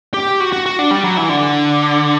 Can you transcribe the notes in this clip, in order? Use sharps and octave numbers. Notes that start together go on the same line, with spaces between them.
G4
F#4
F#4
F#4
D4
G3
F#3
E3
D3